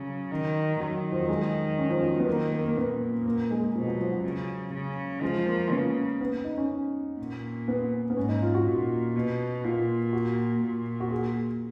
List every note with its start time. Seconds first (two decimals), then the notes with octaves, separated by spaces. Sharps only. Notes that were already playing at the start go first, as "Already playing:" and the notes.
Already playing: C#3 F#3
0.31 D#3
0.80 D#3 F#3
1.12 F3
1.20 F#3
1.29 G#3
1.79 C#4
1.90 F3
2.02 F#3
2.19 B3
2.27 D#3 A#3
2.52 A#3
2.66 A#3
2.76 A#2 B3
3.26 A#3
3.51 G#3
3.75 B2 F3
3.87 F#3
4.00 F3
4.12 F#3
4.24 C#3
4.73 C#3
5.23 F3 G#3
5.47 A#3
5.71 C#3 B3
6.21 B3
6.44 D#4
6.57 C#4
7.19 A#2
7.68 B3
8.10 B3
8.17 G#2 C#4
8.29 D#4
8.42 F4
8.54 F#4
8.66 A#2
9.15 B2
9.64 A#2 F4
10.13 F#4
10.62 A#2
11.00 F#4
11.11 G#4